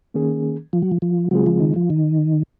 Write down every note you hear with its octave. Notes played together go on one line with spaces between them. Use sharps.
D#3 A#3 C#4 G#4
F3
F#3
F3
F3
C#3 F#3 G#3 C4 F4 G#4
F3
D#3
F3
D#3